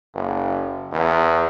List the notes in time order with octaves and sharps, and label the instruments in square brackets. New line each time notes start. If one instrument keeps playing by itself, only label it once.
[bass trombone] F#1
E2